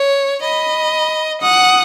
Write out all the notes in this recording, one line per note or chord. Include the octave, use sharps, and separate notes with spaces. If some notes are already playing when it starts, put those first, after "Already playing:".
Already playing: C#5
D#5 B5
F#5 D#6